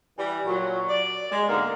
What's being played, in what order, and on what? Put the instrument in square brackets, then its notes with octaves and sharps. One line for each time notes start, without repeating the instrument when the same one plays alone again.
[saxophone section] E3 G3
A#2 F#3
D5
G#3
G#2 B2 D3 A#3 D#4